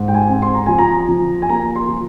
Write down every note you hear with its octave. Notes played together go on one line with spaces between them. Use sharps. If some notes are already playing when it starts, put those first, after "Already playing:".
Already playing: G#2
G5
G#5
C4
C6
A#5
F3 G#5
A#5
F3
G#5
A#3 A#5
C6
F3